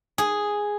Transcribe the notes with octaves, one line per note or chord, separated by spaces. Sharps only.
G#4